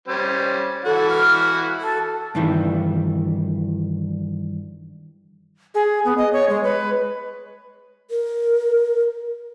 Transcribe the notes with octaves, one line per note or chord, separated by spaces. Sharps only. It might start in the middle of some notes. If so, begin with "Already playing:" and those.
G3 C#4 C5
E3 F#4 A4 F#5
F6
A4
G2 D#3 E3
G#4
B3
D#5
C#5
G#3
B4
A#4